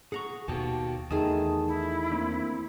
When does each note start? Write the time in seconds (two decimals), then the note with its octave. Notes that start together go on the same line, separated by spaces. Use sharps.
0.12 G#4 F#5 A#5 C#6
0.48 D#2 B2 F#4 G4 G5 A5
1.11 E2 D#3 A3 G#4 A5 D#6
1.68 E4
2.12 A#3 C4 D4